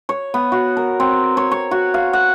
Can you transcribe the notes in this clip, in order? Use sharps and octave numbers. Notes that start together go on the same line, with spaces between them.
C#5
B3
F#4
A#4
C4
C#5
C#5
F#4
F5
F#5